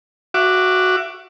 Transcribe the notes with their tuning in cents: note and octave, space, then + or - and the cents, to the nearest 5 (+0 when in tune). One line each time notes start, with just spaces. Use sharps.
F#4 +0 E5 +25 D6 +5